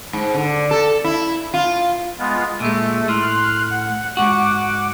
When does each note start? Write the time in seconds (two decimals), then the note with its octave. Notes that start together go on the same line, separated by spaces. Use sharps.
0.13 G#2
0.34 D3
0.71 A4
1.04 E4
1.54 F4
2.19 G#3 B3 F4
2.60 A#2 G#3 A3
3.08 A2 C6 F6 F#6
3.70 F#5
4.17 G#2 F#4 F#5 D6